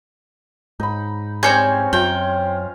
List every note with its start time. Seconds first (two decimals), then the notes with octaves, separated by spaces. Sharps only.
0.80 G#2 D#4 B5
1.43 G3 C4 C#4 C5 C#5 G#5 G6
1.93 F#2 F4 G5 G#5 A#5